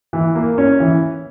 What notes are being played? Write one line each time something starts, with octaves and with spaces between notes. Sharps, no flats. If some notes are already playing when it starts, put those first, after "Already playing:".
E3
A#3
C#4
E3